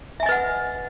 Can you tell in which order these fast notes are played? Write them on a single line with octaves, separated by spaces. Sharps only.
E5 G#5 D#5 B4 F#5